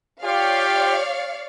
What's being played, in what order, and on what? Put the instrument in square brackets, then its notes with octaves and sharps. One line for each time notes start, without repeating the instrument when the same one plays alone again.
[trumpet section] F4 G4 [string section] C#5 D5 F5